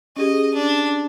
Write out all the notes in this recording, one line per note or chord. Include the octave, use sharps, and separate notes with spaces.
C#4 G4 G#4 D#5
D4